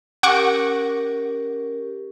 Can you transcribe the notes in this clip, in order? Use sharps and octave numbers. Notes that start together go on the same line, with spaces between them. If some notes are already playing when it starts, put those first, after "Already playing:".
C#4 G4 A#4 F#5 C#6 D6